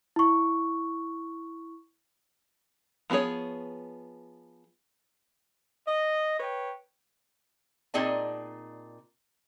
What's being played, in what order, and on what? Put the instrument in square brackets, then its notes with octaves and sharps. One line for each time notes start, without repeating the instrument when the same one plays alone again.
[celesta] E4 C#6
[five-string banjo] F3 B3 F#4 G#4 C#5
[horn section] D#5
B4 C#5 G5
[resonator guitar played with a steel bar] A#2 C4 D#4 G#4 D5 A5